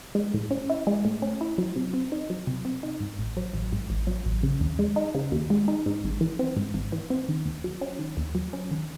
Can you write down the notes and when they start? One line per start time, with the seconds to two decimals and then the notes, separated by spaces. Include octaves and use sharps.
0.15 G#3
0.34 A2
0.51 C#4
0.70 E4
0.87 G#3
1.05 A2
1.22 C#4
1.41 E4
1.58 F#3
1.76 C3
1.93 C4
2.12 D#4
2.30 F#3
2.47 C3
2.65 C4
2.83 D#4
3.00 G#2
3.19 A1
3.37 F#3
3.54 A1
3.73 G#2
3.90 A1
4.07 F#3
4.26 A1
4.43 C#3
4.61 D#2
4.79 G#3
4.96 D#4
5.15 C#3
5.32 D#2
5.50 G#3
5.68 D#4
5.86 G#2
6.04 G#1
6.21 E3
6.39 C4
6.57 G#2
6.74 G#1
6.92 E3
7.10 C4
7.29 D#3
7.45 D#2
7.64 F#3
7.81 C#4
7.99 D#3
8.17 D#2
8.35 F#3
8.53 C#4
8.71 D#3